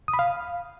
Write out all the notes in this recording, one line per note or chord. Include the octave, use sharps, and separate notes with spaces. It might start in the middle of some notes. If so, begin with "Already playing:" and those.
D#6
B5
F5